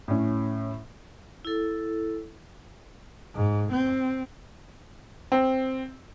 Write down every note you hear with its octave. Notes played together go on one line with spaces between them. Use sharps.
A2 C#4
E4 A4
G#2
C4
C4